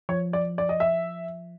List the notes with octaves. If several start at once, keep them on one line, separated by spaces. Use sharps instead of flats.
F3 C#5
D5
D5
D#5
E5